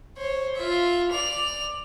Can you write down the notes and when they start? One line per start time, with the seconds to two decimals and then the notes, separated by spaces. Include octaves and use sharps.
0.18 C5 C#5
0.56 F4 E5
1.11 D5 F7